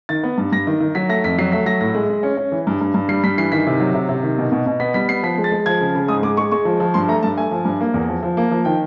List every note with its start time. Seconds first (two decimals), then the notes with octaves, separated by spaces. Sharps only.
0.09 D#3 A6
0.23 B3
0.38 G2
0.52 G2 A#6
0.67 D#3
0.81 D#3
0.95 F#3 B6
1.09 A3 A#6
1.24 F2 B6
1.39 F#3 C7
1.52 A3 B6
1.66 F#3 A#6
1.81 A2 A#6
1.95 G#3
2.09 G#3
2.23 C#4
2.37 C#4
2.52 E3
2.67 G2
2.81 G2
2.94 G2
3.09 G3 C7
3.24 G2 B6
3.38 E3 C7
3.52 D#3 B6
3.67 C3
3.80 F#3
3.95 C3
4.09 C3
4.23 D#3
4.38 B2
4.52 B2
4.66 B2
4.80 B3 B6
4.94 G3 B6
5.08 B3 C7
5.23 F3 B6
5.38 G#3
5.44 A6
5.52 G#3
5.66 F3 G#6
5.81 C#3
5.95 C#3
6.08 G#2 D#6
6.22 G#3 D6
6.37 G#3 C#6
6.51 G#3 C#6
6.65 F3
6.80 F3
6.94 G2 C6
7.08 A3 A#5
7.23 G2 A5
7.37 A3 G#5
7.51 F3
7.65 G2
7.81 A#3
7.94 E2
8.08 F3
8.23 F3
8.37 A#3
8.51 F3
8.65 D#3 G5